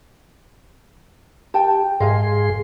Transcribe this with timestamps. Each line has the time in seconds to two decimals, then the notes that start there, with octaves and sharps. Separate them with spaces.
1.54 G4 G5 A5
2.00 G#2 G#4 D#5 F5 G#5 C6